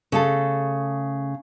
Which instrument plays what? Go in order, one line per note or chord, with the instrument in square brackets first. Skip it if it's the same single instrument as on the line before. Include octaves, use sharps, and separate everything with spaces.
[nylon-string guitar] C#3 A3 A4